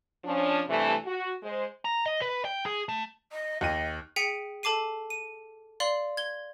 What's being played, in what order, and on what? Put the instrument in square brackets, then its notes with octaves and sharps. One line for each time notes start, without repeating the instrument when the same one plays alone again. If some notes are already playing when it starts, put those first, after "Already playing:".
[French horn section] F3 C#4 D4
G2 C3 E3 A3
F#4
G#3 C5
[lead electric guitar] A#5
D#5
B4
G5
G#4
A3
[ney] D#5
[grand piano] D#2 D#7 [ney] D#5
[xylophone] G#4 G5 B6 C#7 D#7
A4 A5 D6 C7 D#7
D#7
D5 F5 C6 F#7
G#6 G7